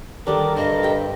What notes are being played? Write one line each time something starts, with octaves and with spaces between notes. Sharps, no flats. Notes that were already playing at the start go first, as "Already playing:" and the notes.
D3 D#3 G3 A4 A#4 D6
G2 C5 D#5
G4 G5